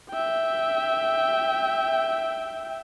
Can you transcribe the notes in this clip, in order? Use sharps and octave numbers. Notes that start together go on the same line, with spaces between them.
E5 G5